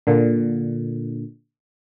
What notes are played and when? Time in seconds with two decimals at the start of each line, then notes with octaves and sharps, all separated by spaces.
0.07 A#2 D3